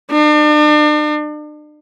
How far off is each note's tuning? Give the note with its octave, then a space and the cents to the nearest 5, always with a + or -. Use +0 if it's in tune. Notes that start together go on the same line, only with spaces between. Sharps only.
D4 +40